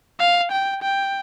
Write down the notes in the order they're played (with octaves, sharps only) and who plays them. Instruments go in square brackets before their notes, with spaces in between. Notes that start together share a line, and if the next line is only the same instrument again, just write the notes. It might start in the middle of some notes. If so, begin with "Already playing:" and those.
[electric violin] F5
G5
G5